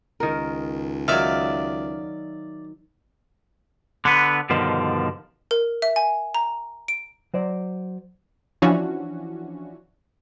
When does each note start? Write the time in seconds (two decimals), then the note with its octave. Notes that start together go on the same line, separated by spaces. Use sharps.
0.20 C#2 D#3 A#4
1.08 D#3 F#3 D5 E5 F5
4.05 D3 B3 B4
4.50 G2 B2 D3 D#3 F3
5.51 A#4
5.82 E5
5.96 G#5
6.35 A#5
6.88 D7
7.34 F#3 C5 D5
8.62 E3 F3 C#4 D4 E4 F#4